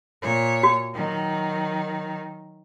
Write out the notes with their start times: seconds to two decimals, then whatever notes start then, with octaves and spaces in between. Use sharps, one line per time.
0.22 A#2 C#5
0.63 F#4
0.93 D#3 F#3